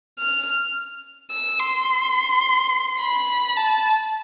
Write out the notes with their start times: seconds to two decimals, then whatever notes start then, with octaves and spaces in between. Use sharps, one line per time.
0.19 F6
1.31 E6
1.59 C6
3.00 B5
3.57 A5